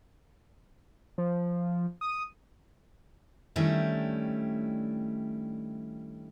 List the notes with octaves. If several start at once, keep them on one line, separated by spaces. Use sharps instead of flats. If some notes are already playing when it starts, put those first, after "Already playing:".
F3
D#6
D#3 G3 A3 C#4 D4 E4